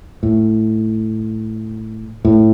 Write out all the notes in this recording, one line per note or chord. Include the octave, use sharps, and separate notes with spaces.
A2
A2